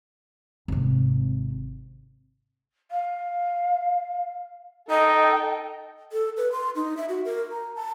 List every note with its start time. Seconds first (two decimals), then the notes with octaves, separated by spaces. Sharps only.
0.68 G#1 C3
2.91 F5
4.90 D#4 A4 D#5 G5
6.12 A4
6.37 B4
6.52 C6
6.75 D#4
6.97 E5
7.09 F#4
7.25 A#4
7.51 A#5
7.76 A5